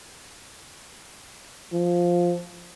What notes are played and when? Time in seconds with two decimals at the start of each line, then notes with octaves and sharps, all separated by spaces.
1.73 F3